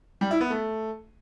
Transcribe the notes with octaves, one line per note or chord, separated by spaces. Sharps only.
G3
E4
B3
A3